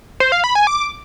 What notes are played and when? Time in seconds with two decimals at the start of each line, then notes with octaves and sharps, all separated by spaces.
0.20 C5
0.32 F5
0.44 B5
0.55 G#5
0.67 D6